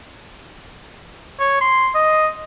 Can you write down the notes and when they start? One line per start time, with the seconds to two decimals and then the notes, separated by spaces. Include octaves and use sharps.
1.40 C#5
1.61 C6
1.95 D#5